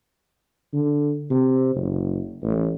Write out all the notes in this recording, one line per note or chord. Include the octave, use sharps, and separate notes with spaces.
D3
C3
F#1
A1